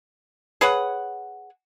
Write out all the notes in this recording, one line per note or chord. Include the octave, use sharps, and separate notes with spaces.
G#4 B4 C#5 F#5